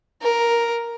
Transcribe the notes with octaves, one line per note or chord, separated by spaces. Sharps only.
A#4